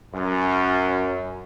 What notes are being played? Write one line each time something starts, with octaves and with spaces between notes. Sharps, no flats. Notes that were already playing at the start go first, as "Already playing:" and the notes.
F#2